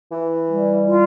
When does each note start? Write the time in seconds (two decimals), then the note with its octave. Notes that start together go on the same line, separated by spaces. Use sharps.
0.12 E3
0.49 G3
0.87 F4